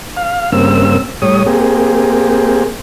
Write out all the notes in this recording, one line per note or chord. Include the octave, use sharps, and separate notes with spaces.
F5
G2 C#3 A#3 C4 E6
A2 G3 C#5 D#6
A#3 C4 G4 G#4